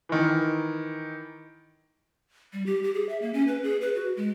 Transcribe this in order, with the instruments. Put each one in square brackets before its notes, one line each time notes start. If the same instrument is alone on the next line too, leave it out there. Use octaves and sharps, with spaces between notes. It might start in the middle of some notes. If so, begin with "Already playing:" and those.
[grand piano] D#3 E3
[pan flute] G3
G4
G4
G#4
E5
A#3
C#4
B4
G#4
B4
F#4
G#3